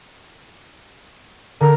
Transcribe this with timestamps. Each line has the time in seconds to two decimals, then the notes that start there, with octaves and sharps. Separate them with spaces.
1.61 D3 A#4